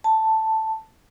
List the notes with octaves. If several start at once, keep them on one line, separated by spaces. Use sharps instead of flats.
A5